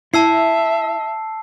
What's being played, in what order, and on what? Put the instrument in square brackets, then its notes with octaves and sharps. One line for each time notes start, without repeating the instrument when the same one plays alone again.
[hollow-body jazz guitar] E4 [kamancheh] E5 [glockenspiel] A5 E6 C7